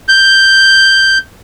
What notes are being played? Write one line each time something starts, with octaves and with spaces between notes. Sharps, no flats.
G6